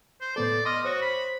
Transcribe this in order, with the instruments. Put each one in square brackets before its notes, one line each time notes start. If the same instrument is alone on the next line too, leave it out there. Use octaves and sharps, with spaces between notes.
[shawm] C5
[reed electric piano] A2 B3 A4 [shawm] D5
[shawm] D#5 [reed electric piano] C6 D6 F6
[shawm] F#4 [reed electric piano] C5 C#5
[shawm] B5